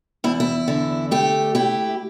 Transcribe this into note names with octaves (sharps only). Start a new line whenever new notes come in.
E2 E4
E4
D3
A3 G4
E4 G4